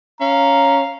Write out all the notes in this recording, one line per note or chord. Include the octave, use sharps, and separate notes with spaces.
C#4 F5 A#5